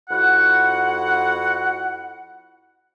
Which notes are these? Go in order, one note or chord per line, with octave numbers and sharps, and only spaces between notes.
F2 E4 F#4 F#5